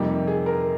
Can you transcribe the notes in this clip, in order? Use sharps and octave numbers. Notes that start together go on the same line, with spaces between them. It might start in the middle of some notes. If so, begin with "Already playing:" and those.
Already playing: F2 C3 G3 A#3 D#4 G4
G#4
A#4